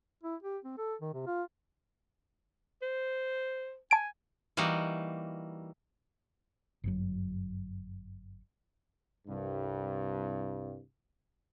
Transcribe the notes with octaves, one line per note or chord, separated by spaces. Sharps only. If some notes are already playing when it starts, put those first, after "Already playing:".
E4
G4
C4
A4
D#3
C3
F4
C5
G#5 A5 D7
E3 G3 A#3 D#4 F#4
G1 F#2 F#3
C2 G2